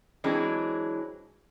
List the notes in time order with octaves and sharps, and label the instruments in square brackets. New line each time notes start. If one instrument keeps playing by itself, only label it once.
[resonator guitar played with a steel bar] E3 F#3 G#3 C4 D4